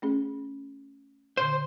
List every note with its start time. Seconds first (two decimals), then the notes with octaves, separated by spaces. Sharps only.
0.02 A3 C#4 G#4
1.37 A#2 D3 C5